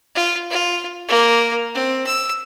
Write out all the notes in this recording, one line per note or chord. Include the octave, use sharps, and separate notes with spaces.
F4
F4
A#3
C4
E6